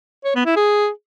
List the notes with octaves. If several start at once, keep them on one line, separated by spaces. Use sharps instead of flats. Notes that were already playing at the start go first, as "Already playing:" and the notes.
C#5
B3
E4
G#4